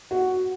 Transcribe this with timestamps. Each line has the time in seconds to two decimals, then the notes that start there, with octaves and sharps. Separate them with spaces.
0.11 F#4